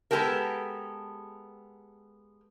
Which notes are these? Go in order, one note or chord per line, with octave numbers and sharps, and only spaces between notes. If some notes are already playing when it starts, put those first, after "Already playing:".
G#3 B3 F4 G4 A4 A#4